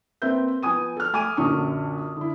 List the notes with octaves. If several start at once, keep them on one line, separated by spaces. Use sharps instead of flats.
A#3 C4 B4 E5 G6
F3 B3 G#5 D#6 D#7
A4 F6
A3 G#5 D6 D#7
A#1 F#2 D3 C#4 C#6 D#6
D3 E4